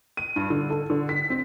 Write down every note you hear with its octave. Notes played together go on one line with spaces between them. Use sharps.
D#7
G2
D3
A4
D3
B6
C4